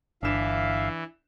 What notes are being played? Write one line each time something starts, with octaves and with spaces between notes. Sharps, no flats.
G1 E3 D4 E5 F5 E7